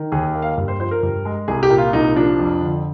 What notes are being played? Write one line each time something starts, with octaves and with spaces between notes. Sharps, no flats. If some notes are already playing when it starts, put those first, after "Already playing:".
Already playing: D#3
D#2 G#4
A#3
F5
G2
C5
F3 C5
A#4
G2
G#3
C2 G#4
G4
A#2
F4
C2 D#4
F3 D4
F2
D3